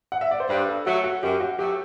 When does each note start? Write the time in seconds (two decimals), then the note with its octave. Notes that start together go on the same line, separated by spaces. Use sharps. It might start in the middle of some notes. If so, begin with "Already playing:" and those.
0.12 F#5
0.21 E5
0.31 D5
0.40 C5
0.50 G2 B4
0.69 A4
0.86 F#3 A3 F#4
1.04 F#4
1.23 F#2 G4
1.40 F#4
1.58 F#3 A3 G4